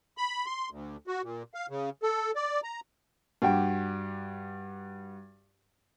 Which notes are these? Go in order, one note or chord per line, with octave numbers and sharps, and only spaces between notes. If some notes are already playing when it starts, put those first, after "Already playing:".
B5
C6
D2
F#4
A#2
F5
C#3
A4
D5
A#5
G2 F#4 G4 G5